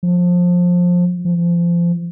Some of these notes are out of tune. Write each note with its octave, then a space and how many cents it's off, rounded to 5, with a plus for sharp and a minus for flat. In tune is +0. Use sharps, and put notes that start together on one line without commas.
F3 +20
F3 -25